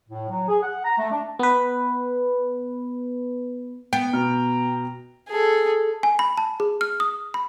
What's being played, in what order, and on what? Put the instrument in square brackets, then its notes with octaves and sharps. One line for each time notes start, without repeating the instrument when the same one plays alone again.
[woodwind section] A2
F#3
G#4
F#5
A#5
A3
D4
[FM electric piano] B3 B4
[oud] B3 [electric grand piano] G5
[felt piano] B2 F6 [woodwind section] A#5
[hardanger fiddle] G#4 A4
[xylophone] G#5
B5
A5
G#4
F6
D#6
B5